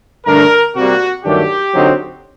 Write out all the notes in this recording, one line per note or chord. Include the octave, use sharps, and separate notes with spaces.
G2 D3 A3 D4 A#4
C3 G3 A#3 F#4
G2 D#3 F#3 A3 D4 G4
D3 F#3 C4 D#4